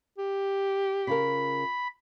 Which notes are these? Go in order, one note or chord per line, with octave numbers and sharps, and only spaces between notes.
G4
C#3 F4 A#4 B5